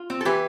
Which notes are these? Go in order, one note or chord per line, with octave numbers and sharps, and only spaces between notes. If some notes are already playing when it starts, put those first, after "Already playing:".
Already playing: F4
C4
A4
E3 G4 B4